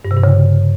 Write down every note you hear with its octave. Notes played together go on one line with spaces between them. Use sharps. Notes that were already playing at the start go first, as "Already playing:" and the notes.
G2
C3
G2
C#3